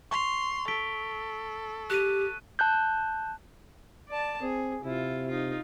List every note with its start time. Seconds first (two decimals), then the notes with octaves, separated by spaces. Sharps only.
0.11 C6 C#6 F7
0.68 A4 B6 D7 G7
1.90 G4 F#6 D#7
2.59 A5 F#6 G6
4.08 D5 A5
4.42 C4 G#4
4.84 C3 E4 F4
5.28 D#4 F4